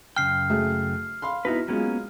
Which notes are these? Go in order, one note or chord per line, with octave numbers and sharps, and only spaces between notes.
F#2 C#3 G5 F6 C7
F#3 A3 G#4
F5 B5 C6
B2 B3 D#4 E4 B4
F#3 G#3 A#3 B3 C#4 F4